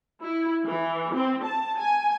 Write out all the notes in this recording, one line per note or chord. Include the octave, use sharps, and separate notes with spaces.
E4
E3
C4
A5
G#5